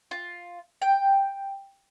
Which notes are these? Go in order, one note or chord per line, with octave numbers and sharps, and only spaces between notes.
F4
G5